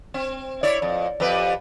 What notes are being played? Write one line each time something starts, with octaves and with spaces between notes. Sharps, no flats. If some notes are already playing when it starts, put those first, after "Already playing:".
C4
E4 C#5 D5
F2
F2 G4 B4